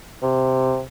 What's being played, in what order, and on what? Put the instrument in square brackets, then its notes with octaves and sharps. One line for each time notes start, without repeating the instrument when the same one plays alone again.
[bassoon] C3